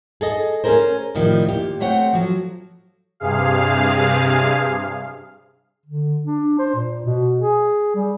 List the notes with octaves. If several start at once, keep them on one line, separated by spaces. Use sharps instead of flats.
G#4 A4 D#5
C#4 D4 G#4 A#4 C5
A2 C3 D#3 F3 G3
A#2 G4
A3 C4 C5 C#5 F#5 G5
F3 F#3
G2 C3 G#4 F5
D3
D4
C5
A#2
B2
G#4
G3